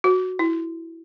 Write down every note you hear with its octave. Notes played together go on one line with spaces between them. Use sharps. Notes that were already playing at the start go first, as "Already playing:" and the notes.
F#4
E4